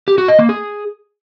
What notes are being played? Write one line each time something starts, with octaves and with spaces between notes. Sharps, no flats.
G4
F#4
D#5
A#3
G#4